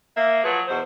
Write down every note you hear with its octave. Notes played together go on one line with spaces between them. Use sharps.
A#3 E5
F3 F#3 G#4 B4
E2 B2 C5